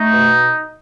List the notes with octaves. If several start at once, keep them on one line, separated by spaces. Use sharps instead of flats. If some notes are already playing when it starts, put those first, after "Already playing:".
Already playing: A3 D#4
B2